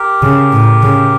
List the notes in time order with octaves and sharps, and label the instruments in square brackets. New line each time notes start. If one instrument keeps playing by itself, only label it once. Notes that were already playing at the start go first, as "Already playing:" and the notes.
Already playing: [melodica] G4 A#4
[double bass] C#3
A2
C#3